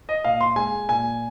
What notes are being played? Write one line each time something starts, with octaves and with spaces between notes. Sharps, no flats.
D#5
A#2 F5
C6
G#3 G#5
A#2 G#5